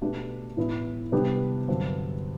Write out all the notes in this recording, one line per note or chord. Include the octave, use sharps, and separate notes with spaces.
B2 A3 D4 G4
A2 E3 B3 E4
C3 G3 B3 D4 G4
G2 D3 F#3 C4